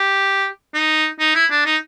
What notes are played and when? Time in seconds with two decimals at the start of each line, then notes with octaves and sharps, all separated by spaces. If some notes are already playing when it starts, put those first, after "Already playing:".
Already playing: G4
0.74 D#4
1.20 D#4
1.35 E4
1.51 D4
1.66 D#4